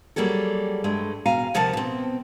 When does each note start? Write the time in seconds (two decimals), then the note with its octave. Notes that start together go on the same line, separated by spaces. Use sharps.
0.16 F#3 G3 A#3 G#4 A4
0.84 G2 G#3 A3
1.26 D#2 B2 F5 G#5 A#5
1.54 D2 C3 F3 A#4 F#5 A5
1.73 B2 C4